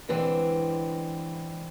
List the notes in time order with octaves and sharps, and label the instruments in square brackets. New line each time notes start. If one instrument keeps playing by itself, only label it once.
[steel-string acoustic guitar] D3 E3 G#3 C4